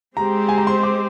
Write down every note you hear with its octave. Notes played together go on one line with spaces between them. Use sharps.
G#3 C4 G4 C5 A#5
G#5
A#5
C6
D6